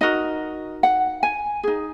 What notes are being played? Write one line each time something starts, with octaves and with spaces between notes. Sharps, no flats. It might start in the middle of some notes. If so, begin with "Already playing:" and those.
D#4 F#4 A#4 D#5
F#5
G#5
D#4 G#4